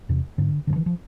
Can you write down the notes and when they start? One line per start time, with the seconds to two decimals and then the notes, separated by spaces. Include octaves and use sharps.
0.09 E2 C3
0.38 G#2 D3
0.67 G2 D3
0.76 E3
0.86 F3